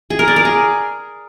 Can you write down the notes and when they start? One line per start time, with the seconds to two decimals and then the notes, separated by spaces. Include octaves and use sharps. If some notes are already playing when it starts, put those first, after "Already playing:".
0.10 G#4
0.19 A#4
0.28 D5
0.36 A#4
0.45 G#4